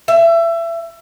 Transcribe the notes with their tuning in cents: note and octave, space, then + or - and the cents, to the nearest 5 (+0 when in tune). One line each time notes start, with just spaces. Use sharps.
E5 +25